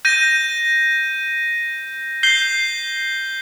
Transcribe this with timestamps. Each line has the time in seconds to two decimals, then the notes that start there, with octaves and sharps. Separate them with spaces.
0.05 G6 A#6 D#7
2.23 G6 C7 G7